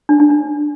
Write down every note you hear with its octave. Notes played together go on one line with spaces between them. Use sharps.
D4
D4
D4